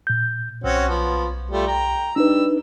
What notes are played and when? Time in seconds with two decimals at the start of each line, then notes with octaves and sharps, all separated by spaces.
0.07 A#2 G6
0.64 B1 C4 C#4 F#4
0.89 F3 B3
1.51 G3 A3 F4
1.67 G5 A#5
2.16 G3 D4 D#4 B4 E6